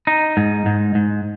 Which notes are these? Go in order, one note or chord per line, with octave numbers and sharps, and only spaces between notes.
D#4
G#2
G#2
G#2